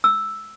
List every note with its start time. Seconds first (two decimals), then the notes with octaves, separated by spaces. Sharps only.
0.04 E6